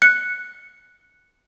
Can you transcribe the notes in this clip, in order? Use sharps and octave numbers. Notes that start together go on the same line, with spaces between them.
F#6 C#7